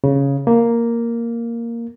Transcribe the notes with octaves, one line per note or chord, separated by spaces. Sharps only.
C#3
A#3